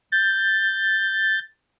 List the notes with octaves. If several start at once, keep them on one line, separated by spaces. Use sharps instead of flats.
G6 A6